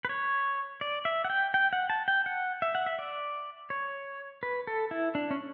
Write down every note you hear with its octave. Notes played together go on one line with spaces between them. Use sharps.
B4
C#5
D5
E5
F#5
G5
G5
F#5
A5
G5
F#5
E5
F#5
E5
D5
C#5
B4
A4
E4
D4
C#4